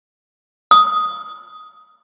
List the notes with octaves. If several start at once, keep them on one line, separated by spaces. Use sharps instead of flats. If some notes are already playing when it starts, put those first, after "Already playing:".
D#6